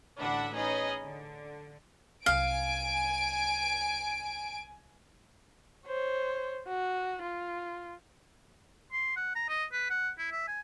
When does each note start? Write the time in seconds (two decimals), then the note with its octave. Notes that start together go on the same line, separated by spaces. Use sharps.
0.19 A1 D2 D4 E5 F#5 B5
0.53 C#4 D#4 G#4 B4 D#5
1.03 D3
2.26 C2 F#3 F5 G#5 D7
5.87 C5 C#5
6.68 F#4
7.23 F4
8.92 C6
9.16 F#5
9.35 A#5
9.49 D#5
9.73 B4
9.90 F#5
10.18 E4
10.32 E5
10.48 G#5